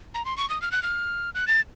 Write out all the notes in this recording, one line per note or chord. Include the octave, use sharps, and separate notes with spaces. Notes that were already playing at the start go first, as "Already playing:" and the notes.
A#5
C6
C#6
D#6
F6
F#6
F6
F#6
A6